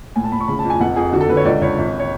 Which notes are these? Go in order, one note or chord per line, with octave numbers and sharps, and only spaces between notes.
A2 G#5
A5
A2 B5
C#6
C#3 B5
A5
F2
G#5
F1 F#5
F2 G#4
D3 F#4
A4
D3 B4
C#5
C#2 D5
C#2 C#5
G#1
C#5